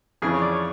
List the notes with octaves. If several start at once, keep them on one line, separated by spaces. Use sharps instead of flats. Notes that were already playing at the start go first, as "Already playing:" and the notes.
F2 C#3 E3 G#4
C#5
D5
C#5